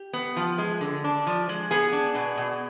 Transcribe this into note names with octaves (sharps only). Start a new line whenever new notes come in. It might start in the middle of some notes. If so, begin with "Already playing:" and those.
Already playing: G4
B3
F3
G#3
D3
D4
F3
G#3
B3 G#4
D4
B2
B2